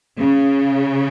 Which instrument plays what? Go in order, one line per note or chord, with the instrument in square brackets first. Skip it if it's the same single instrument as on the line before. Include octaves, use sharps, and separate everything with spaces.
[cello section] C#3